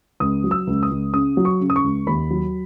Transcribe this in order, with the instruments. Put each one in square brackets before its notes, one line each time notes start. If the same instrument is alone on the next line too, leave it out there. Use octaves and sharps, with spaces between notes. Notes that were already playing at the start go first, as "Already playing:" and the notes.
[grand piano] C#2 D#6
F#3
E6
C#2
D#6
C#2
C#3 D#6
F#3
C#6
C#3
D#6
C#6
C#2
D#2 B5
F#3